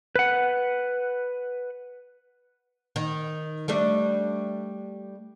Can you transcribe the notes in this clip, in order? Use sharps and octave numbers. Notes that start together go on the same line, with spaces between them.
B4 F#5
D#3
G3 A3 D4